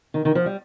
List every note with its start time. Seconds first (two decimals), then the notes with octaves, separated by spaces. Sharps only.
0.14 D#3
0.25 D#3
0.35 F3
0.46 G3